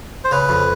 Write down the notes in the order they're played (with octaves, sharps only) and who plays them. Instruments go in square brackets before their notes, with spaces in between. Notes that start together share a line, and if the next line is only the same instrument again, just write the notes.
[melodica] C5
[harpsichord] C#3 [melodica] B4
[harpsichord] F2